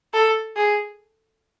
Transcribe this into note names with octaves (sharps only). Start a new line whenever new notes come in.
A4
G#4